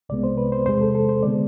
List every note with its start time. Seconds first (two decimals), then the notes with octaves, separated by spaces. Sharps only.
0.09 C2 C3 G#3 B3 D5
0.23 C5
0.38 B4
0.52 C5
0.66 E2 C3 G#3 C5
0.81 A4
0.95 A4
1.09 C5
1.23 D3 G#3 B3 D5